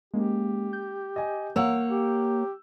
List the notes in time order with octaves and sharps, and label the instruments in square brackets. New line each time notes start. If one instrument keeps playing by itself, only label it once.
[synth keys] G#3 A#3 C#4 [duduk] G4
[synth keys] G6
[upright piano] D#5 G#5
[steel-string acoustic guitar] A#3 C#5 [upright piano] F5 F#5 E6
[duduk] G4